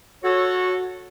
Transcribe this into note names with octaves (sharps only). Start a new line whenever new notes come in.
F#4 A4 C#5